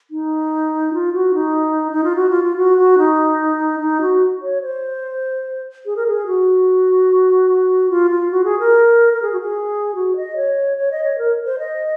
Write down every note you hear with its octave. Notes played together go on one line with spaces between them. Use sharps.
D#4
F4
F#4
D#4
D#4
F4
F#4
F4
F4
F#4
F#4
D#4
D#4
F#4
C#5
C5
G#4
A#4
G#4
F#4
F4
F4
F#4
G#4
A#4
A#4
G#4
F#4
G#4
F#4
D#5
C#5
C#5
D#5
C#5
A#4
C5
D#5